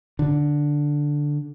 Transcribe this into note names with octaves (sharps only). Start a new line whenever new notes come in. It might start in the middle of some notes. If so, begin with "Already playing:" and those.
D3